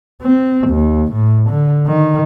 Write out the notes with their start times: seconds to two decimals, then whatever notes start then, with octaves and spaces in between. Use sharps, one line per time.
0.22 C4
0.68 D#2
1.12 A2
1.50 D3
1.86 D#3